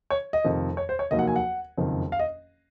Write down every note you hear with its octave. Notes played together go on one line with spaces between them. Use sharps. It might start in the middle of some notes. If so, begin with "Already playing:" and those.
C#5
D#5
F1 F2 D#3
C#5
C5
C#5
F1 D#2 D#3 F#3 A#3 D#5
F#5
G#5
F#5
F#1 F2 D#3
F5
D#5